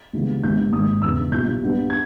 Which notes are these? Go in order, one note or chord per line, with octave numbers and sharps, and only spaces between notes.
C#2 C#3 E3 G3 B3
G#1 G#2 G3 B3 G6
G#1 G2 D#3 D#6
E1 E2 C#3 E6
B1 A#2 G3 G6
G2 G3 B3
G#6